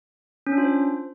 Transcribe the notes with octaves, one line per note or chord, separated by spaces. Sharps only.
C#4
D4
F4
C5